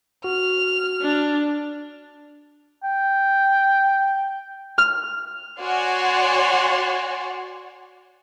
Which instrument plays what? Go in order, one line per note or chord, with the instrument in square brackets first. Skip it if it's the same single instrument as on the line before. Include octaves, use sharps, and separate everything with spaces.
[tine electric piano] F#4 [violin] F6
[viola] D4
[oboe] G5
[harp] F6
[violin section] F#4 C#5 D5 F#5 G#5 C6